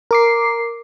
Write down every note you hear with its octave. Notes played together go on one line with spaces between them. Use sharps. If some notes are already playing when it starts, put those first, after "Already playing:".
A#4 D6 C7